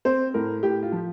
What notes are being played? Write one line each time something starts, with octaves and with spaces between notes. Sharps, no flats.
C4 C5
A2 A#4
A2 G4
F4
F3